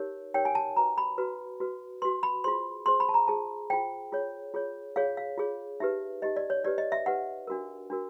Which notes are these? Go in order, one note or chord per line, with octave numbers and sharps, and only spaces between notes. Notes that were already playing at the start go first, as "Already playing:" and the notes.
Already playing: D#4 G4 A#4 C#5
D#4 G4 A#4 C#5 G5
G#5
A5
F#4 B4 A#5
B5
F#4 B4
F#4 B4
F#4 B4 C6
B5
F4 G#4 C5 C6
F4 G#4 C5 C6
B5
A5
A#5
F4 G#4 C5 A5
F4 G#4 C5 G5
F4 G#4 C#5
F4 G#4 C#5
F4 G#4 C#5 F5
F5
F4 G#4 C#5
D#4 G4 B4 E5
D#4 G4 B4 D#5
D5
C#5
D#4 G4 B4 D5
D#5
E5
D#4 G4 B4 F#5
D4 F#4 A#4
D4 F#4 A#4